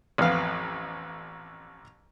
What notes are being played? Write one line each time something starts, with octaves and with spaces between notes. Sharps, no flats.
A1 F2 B3 F5